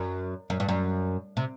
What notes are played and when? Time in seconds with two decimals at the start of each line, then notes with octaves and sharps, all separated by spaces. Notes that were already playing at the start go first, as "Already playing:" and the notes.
Already playing: F#2
0.50 F#2
0.60 G2
0.69 F#2
1.37 C3